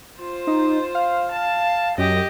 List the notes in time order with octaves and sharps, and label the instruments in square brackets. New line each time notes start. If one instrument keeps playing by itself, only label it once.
[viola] F4 C5
[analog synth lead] D#4
F5
[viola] A5
[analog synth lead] F#2 [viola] G4 D#5